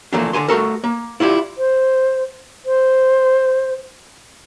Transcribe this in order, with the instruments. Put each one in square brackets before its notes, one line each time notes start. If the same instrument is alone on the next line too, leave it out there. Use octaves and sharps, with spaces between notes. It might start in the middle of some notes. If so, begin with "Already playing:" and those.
[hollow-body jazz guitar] E3 F3 A3 A#3 D4
D3 G#4 G#5 C6
A3 F#4 A4 A#4
A#3
E4 F4 G4 D5
[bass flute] C5
C5